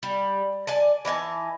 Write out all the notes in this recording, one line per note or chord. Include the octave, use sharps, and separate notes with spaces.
G3
D5 G#5 A5
E3 D#4 G#5 A5